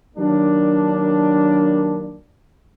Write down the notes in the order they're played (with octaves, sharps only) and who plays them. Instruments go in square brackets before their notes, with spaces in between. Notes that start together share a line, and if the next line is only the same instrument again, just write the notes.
[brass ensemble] D#3 F#3 G3 A#3 D4